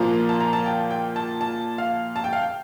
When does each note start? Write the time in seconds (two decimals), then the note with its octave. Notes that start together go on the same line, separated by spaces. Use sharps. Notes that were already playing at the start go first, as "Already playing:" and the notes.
Already playing: A#2 F3 A#3 F4 A#5
0.29 A5
0.41 A#5
0.53 A5
0.66 G5
0.91 G5
1.16 A5
1.41 A5
1.78 F5
2.16 A5
2.24 G5
2.33 F5
2.41 G5